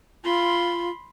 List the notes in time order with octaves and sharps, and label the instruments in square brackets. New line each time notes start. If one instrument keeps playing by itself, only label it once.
[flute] F4 [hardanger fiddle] B5 C6